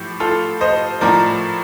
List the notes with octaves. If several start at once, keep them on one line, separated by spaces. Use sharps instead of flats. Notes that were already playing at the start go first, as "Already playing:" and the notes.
Already playing: A2 F3 G4
F4 A4
C5 D#5
A2 F3 A#4 D5